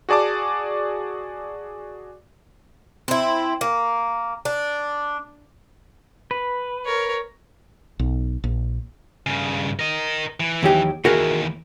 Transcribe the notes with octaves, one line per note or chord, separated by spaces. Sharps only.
F#4 G#4 D5 A5 D6
C4 E4
A#3
D4
B4
A#4 C#5
B1
A#1
G2 C#3
A#4 D#5
E3
D#2 F#3 G4
D#2 E3 F#4 G#4 A#4